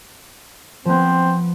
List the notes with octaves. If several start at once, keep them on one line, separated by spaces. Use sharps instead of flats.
F3 B3 C4